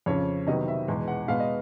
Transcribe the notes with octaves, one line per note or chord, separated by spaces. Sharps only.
F2 C#3 F3 C#5
C3 D#3 F#3 B3 D#5
E5
E2 B2 G#3
F#5
B2 G#3 B3 F5
D#5